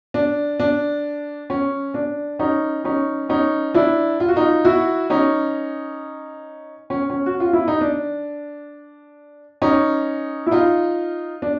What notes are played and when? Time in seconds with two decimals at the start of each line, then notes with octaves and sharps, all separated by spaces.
0.14 D4
0.60 D4
1.50 C#4
1.94 D4
2.39 C#4 D#4
2.84 C#4 D#4
3.29 C#4 D#4
3.74 D4 E4
4.20 F4
4.29 F#4
4.36 D#4 F4
4.65 E4 F#4
5.10 C#4 D#4
6.90 C#4
7.10 C#4
7.26 F#4
7.40 F4
7.53 E4
7.68 D#4
7.81 D4
9.62 C#4 D#4
10.47 E4
10.51 D#4 F4
11.42 D4